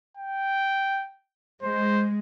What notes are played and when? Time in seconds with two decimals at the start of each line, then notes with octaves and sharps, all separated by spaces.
0.17 G5
1.63 G#3 C5